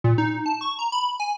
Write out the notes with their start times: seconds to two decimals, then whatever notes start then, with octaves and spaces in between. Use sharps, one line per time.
0.04 A#2
0.18 D#4
0.46 A5
0.61 C#6
0.79 A#5
0.92 B5
1.20 G#5